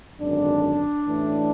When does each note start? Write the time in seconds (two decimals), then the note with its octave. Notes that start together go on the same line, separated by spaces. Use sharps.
0.21 G#1 F#2 D3 D4
1.07 A1 A2 E3 A3